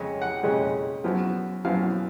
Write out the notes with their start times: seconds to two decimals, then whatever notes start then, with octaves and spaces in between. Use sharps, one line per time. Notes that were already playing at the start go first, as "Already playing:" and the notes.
Already playing: F2 C#3 G#3 C#4
0.22 F#5
0.43 F2 C#3 G#3 C#4
1.04 F#2 F3 B3
1.65 F#2 F3 B3 F5